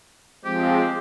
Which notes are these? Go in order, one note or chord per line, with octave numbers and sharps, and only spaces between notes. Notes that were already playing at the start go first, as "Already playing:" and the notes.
F3 G#3 C4 G4